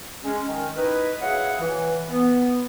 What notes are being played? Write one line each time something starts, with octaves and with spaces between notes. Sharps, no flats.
G#3 C#4
D#3
D#4 E4 B4
E4 F#4 G#4 C#5 F5 F#5
E3
B3